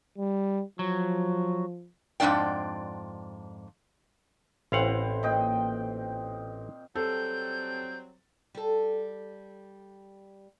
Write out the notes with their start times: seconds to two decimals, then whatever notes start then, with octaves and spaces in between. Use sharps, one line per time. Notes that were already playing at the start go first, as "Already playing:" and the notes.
0.18 G3
0.79 F3 F#3
2.20 F2 G#2 A#3 D4 D5 G5
4.72 A1 C4 E4 F5 F#5
5.23 A#2 D#5 G5
6.95 F#3 G3 C4 A4 G6
8.55 G3 A4